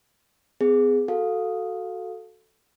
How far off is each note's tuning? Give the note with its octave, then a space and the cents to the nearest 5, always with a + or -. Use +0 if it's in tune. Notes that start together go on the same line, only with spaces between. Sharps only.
B3 +45 G#4 +0
F#4 +0 A4 +0 F5 +20